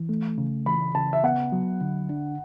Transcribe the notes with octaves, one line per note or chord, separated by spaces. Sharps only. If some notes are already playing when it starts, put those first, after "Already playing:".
Already playing: E3
A3
C#3
E3 B5
C#3 A5
E5
B3 F#5
F#3
D3
D4